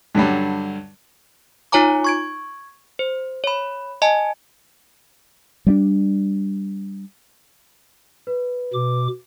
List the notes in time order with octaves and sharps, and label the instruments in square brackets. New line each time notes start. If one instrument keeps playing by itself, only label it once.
[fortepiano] G2 D3 F#3 G3
[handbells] D#4 F4 C#5 G#5 A#5 D6
C#6 G#6 D7
C5
C#5 B5
D#5 G#5 A5
[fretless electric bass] G3 B3 D4
[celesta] B4
[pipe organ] B2 D6